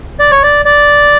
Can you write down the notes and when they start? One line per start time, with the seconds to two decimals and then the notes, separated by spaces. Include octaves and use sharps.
0.20 D5
0.31 C#5
0.43 D5
0.65 D5